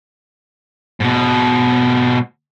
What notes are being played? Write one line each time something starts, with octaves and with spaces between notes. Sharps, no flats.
G#2 B2